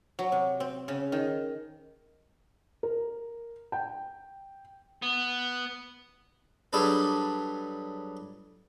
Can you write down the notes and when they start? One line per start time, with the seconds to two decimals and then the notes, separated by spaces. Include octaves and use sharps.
0.19 F#3
0.32 C3
0.60 C4
0.88 C#3
1.12 D#3
2.83 A#4
3.72 G5
5.02 B3
6.73 F#3 G3 D4 G#4 A4 B4